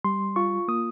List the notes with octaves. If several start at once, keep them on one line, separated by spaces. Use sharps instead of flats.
G3 C6
F4 C#6
A#3 D#6